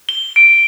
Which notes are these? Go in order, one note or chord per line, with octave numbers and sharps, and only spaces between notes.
G7
D7